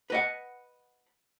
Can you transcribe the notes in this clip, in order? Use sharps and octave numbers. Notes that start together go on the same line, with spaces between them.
B4 D#5 F#5